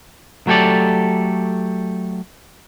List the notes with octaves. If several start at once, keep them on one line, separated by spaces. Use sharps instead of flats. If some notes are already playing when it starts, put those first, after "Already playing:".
F#3 A3 G4 A4 D5